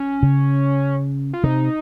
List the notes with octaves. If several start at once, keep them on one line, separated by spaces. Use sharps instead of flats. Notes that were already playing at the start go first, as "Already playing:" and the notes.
Already playing: C#4
C#3
F4
C3 D#4